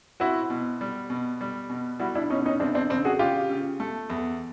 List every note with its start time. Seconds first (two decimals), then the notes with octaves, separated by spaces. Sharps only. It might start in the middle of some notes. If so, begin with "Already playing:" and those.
0.20 C4 E4 F#4
0.50 B2
0.81 G3
1.10 B2
1.41 G3
1.70 B2
2.00 G3 E4 F#4
2.15 D4 E4
2.30 B2 C#4 D#4
2.45 C#4 D#4
2.60 E2 C4 D4
2.75 C4 D4
2.90 C#3 C4 D4
3.05 F#4 G#4
3.19 C#3 F4 G4
3.50 C#3
3.80 A3
4.10 E2